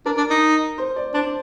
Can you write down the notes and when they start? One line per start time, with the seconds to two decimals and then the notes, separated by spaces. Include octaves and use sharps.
0.06 D4 A#4
0.18 D4
0.30 D#4
0.78 C5
0.96 D5
1.14 D4 C5